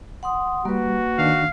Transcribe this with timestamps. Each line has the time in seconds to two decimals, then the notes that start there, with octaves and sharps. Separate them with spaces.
0.23 F#5 C6 D#6
0.65 G3 A#3 F#4 B4
1.18 D#3 D4 F5